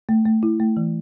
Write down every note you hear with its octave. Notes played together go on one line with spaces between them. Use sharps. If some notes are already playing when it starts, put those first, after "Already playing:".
A3
A3
E4
A3
E3